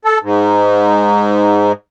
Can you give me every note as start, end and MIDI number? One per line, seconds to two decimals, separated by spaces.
0.05 0.18 69
0.23 1.72 44